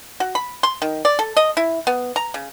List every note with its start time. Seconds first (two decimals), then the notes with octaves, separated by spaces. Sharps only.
0.20 F#4
0.35 B5
0.63 C6
0.82 D#3
1.05 D5
1.19 A4
1.37 D#5
1.57 E4
1.87 B3
2.16 A#5
2.34 C#3